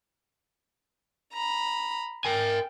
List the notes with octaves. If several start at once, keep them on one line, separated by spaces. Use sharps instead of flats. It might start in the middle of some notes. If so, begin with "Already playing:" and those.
A#5 B5
A#4 G5 G#5